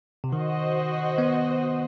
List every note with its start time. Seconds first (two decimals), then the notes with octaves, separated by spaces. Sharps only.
0.24 C3
0.32 D#3 F#4 C5 D#5
1.18 B3